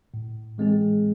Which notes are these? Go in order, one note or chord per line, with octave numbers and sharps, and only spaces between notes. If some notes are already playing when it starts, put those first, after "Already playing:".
A2
E3 G#3 C4 G#4